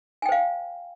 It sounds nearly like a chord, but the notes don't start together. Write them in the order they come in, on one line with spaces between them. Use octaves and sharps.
G#5 G5 C5 F5